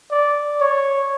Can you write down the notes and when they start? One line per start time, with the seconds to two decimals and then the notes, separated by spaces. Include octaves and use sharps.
0.11 D5
0.61 C#5